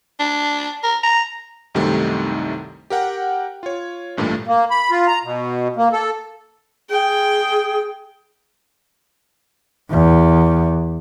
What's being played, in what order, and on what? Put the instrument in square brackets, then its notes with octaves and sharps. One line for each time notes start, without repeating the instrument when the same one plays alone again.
[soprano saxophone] D4
A#4
A#5
[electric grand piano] C2 F#2 C3 D#3 G3 A3
G4 A#4 F#5 G5
F4 C#5
A1 G2 A#2 A3
[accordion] A#3
B5
F4
A#5
B2
A#3
A4
[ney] G#4 [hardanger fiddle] G5
[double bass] E2